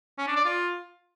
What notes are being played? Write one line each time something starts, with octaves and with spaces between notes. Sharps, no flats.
C#4
D4
D5
F4